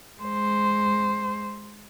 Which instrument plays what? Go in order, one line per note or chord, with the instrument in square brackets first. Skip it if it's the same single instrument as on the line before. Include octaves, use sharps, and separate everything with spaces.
[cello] G#3 C5